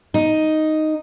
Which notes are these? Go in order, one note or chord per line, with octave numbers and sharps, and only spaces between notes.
D#4